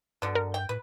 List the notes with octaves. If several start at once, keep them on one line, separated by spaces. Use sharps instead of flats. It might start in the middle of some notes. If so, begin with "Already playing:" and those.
G2 B2 D3
A#4
G5
A2 B4